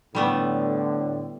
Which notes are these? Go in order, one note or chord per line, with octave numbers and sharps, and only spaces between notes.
A2 D3 G3 A3 B3